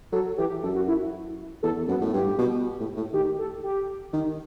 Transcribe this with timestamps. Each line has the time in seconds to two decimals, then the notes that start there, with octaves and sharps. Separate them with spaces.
0.12 F#3 A4
0.37 E3 G4
0.63 F#2 A4
0.75 F#4
0.88 E4
1.63 E2 A4
1.88 F#2 B3
2.01 A2
2.13 G2 G4
2.38 B2
2.80 A2
2.97 A2
3.13 D#3 G4
3.39 A4
3.63 G4
4.13 D#3